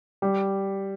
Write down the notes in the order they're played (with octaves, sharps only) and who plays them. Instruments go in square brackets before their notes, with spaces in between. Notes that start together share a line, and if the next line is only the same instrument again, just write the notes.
[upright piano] G3